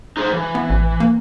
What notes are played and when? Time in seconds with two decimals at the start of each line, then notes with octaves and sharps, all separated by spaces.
0.17 D#4 G#4 C5
0.33 E3
0.55 B3
0.70 A1
1.00 A#3